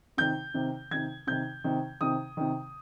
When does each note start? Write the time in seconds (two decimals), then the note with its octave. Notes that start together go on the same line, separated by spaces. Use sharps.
0.17 C3 D#3 G6
0.54 C3 D#3
0.91 C3 D#3 G#6
1.27 C3 D#3 G6
1.64 C3 D#3
2.01 C3 D#3 D#6
2.37 C3 D#3